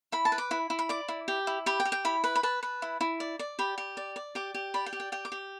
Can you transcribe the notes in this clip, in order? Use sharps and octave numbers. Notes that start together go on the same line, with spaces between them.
E4 B5
A5
B4
D6
E4 B5
E4
B5
D5 D6
E4
G4
E4
G4 B5
G5
G4
G5
E4 B5
B4
B5
B4 A5
B4
E4
E4
D5
D5
G4 B5
G4
D5
D5
G4 D6
G4
D5 B5
G5
G4
G5
G4 G5
D6
G4